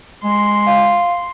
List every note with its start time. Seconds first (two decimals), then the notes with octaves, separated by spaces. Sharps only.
0.24 G#3 C6
0.67 F5